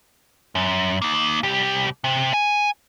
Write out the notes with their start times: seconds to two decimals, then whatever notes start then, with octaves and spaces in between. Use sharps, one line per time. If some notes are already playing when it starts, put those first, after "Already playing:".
0.55 F#2
1.02 A#3 D#4
1.43 C2 G4
2.04 C3
2.33 G#5